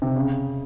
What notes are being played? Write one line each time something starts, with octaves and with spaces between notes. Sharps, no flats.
C3
C#3